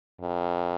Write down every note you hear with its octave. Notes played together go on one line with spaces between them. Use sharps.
F2